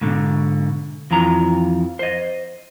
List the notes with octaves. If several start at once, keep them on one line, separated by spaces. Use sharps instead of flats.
G#2 B2 D3
F2 E3 F3 A#5
C5 D#5